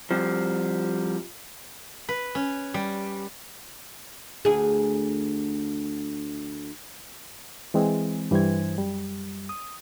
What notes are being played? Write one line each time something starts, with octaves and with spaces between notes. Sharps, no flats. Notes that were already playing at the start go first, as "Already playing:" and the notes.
F3 G3 C4
B4
C#4
G3
D2 G#4
E3 G#3 C4 G#4
G2 E3 G3 C5 G#6
F#2 G3
D#6